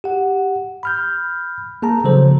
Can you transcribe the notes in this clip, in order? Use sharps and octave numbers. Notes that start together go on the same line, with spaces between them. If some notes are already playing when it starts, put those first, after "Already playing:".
G4 F#5
B5 F6 G6
A#3 G#4 A5 A#5
C#3 F3 F#3 A4 C5